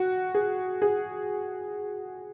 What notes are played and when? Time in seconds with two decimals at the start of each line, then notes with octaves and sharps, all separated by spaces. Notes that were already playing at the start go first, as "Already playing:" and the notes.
Already playing: F#4
0.35 G#4
0.82 G#4